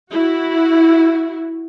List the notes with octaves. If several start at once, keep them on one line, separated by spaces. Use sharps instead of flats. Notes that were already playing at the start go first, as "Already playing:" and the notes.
E4 F#4